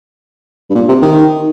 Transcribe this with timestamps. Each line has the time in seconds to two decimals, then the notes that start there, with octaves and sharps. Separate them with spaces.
0.70 G2
0.75 A#2
0.88 C3
1.02 D#3